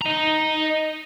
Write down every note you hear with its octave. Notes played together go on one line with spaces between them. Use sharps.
D#5 A#5